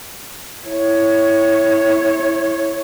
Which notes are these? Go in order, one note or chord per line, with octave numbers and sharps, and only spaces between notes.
E4 C#5